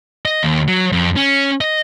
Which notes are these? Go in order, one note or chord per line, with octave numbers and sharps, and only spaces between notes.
D#5
D#2
F#3
F2
C#4
D#5